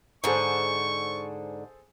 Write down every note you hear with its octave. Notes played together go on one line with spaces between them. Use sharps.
G#2 D3 G#4 A4 C5 C#6